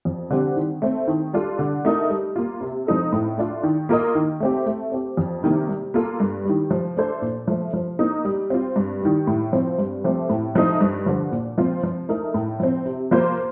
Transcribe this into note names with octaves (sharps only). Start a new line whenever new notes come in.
F2
D3 G3 C4 G4
D#3
A3 C4
D#3
G3 D4 F4 A4
D3
A3 D#4 A#4
G3
A#3 F4
C3
F3 C4 D#4 A4
A2
A3 D4 F4
D#3
A#3 F4 A#4 D#5
D#3
A3 C4 G4
A3
C4 G4
F2
C3 D#3 G3 A#3
G3
A#3 F4 A4
G2
D#3 G3
F3
A3 D4 A4 C5
A#2
F3 A3
F3
A#3 D#4
G3
C4 F4
G2
D#3 G3
A2
F3 C4 F4
G2
F3 A3 C4 G4
A2
F3 A3 D#4
G2
D3 F3
A#2
F3 C4 F4
F3
A3 D#4 A#4
A2
F3 C4
C3
F3 A#3 F4 C5